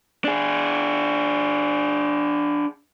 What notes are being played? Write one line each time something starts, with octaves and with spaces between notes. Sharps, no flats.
D4 G#4